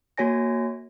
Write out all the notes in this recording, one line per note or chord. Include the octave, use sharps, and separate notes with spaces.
A#3 F#4 C#5 G#5 A#6